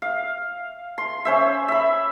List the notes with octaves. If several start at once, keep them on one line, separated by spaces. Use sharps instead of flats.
F5
C6
C#4 C5 E5
E5 B5